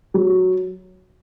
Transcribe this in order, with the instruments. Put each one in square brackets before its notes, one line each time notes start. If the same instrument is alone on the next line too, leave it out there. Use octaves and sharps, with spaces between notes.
[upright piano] F#3